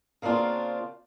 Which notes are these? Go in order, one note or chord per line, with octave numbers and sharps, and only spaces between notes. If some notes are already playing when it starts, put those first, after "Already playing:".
C#3 A#3 C4 D4 F4